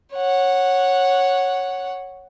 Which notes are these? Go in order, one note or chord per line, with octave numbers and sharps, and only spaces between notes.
C#5 F#5